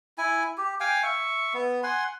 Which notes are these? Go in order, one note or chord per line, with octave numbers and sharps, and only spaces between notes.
E4 G#5
G4
F5 G5 G#5
E5 C#6
B3
F#5 G#5 C6